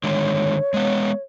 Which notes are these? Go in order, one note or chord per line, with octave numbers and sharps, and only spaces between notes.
D3 D#3 G#3 C#5
G#3 B3